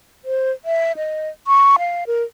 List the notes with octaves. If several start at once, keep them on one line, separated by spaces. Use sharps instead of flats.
C5
E5
D#5
C#6
F5
A#4